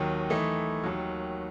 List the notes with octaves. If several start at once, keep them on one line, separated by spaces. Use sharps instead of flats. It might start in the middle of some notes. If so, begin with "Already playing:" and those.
Already playing: D#2 D#3 F#3
E3 A3 D#4
D#2 D#3 F#3